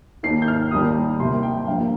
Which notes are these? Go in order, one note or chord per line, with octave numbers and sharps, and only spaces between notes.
D#2 D#3 A#3 C7
G6
F6
D#2 D#3 G3 A#3 D#6
C2 C3 G3 A#3 C6
G5
G2 F3 A#3 F5